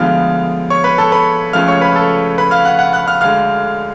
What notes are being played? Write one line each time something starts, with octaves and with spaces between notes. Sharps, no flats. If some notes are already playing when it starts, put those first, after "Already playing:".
Already playing: D2 D3 F3 G#3 B3 F5 F6
C#5 C#6
B4 B5
A4 A5
B4 B5
C#2 C#3 F3 A3 F5 F6
C#5 C#6
B4 B5
A4 A5
B4 B5
F5 F6
F#5 F#6
F#5 F#6
F#5 F#6
F5 F6
D2 D3 G#3 F5 F6